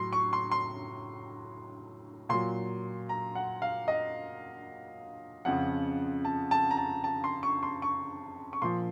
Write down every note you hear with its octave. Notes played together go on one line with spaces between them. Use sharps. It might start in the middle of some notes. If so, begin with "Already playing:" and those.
Already playing: A2 F#3 C6
C#6
C6
C6
A#2 F#3 C6
A#5
F#5
F5
D#5
F2 C#3 F3 F#5
A5
A5
A#5
A5
A5
C6
C#6
C6
C#6
C#6
A#2 F3 C6